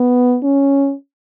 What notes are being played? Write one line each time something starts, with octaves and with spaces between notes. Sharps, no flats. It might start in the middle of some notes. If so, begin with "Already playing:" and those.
Already playing: B3
C#4